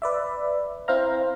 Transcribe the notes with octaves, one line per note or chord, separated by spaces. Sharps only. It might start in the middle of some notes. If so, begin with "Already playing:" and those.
B4 D5 E5
C4 E4 C5 F5 A#5